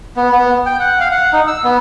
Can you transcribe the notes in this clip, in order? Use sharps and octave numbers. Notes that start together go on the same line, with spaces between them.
B3
B3
G5
F#5
F5
F#5
D#4
E6
B3